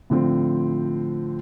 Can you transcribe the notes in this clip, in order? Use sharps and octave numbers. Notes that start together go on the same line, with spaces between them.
A2 D3 F3 C4